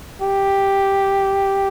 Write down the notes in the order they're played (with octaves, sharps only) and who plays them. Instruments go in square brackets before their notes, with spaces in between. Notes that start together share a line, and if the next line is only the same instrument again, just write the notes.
[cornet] G4